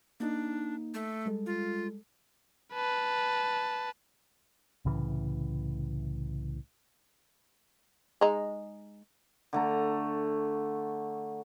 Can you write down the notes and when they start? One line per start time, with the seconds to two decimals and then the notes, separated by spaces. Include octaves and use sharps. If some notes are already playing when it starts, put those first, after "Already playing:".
0.20 A#3 D4 D#4
0.94 A3
1.26 G3 G#3 A4
1.46 F4
2.74 B4 A5
4.85 C2 A2 C#3 E3
8.21 G#3 D#4
9.53 D3 A3 A#5